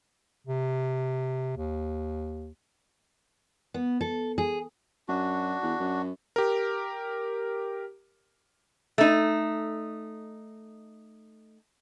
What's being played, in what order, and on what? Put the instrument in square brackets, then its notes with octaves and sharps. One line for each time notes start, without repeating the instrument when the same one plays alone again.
[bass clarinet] C3
D#2
[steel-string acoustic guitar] B3
A4
G#4
[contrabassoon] F#2 [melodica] D4 F#4
[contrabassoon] E2
F#2
[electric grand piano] G4 A#4
[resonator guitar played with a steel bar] A3 D#4